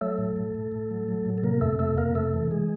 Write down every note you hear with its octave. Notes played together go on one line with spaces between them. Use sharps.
F#3 A3 A4
A2
A2
A2
A2
F#3
F#3
A2
A4
C3 A#3 A#4
F2 A3 A4
C3 A3 A4
F2 A#3 A#4
C3 A3 A4
E3
G#3 G#4